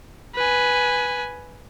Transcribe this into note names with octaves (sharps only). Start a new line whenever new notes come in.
B4 G#5